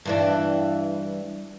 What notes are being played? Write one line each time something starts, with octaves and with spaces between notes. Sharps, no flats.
G2 E3 D4